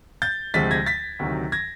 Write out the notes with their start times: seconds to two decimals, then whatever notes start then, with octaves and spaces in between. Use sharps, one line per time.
0.22 G6 A6
0.54 D2 C3 F3 G#3 A6 B6
0.71 G#6 A#6
0.86 A6 B6
1.19 D2 C3 D#3 F#3
1.52 G#6 A#6